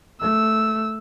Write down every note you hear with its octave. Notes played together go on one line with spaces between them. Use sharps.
A3 E6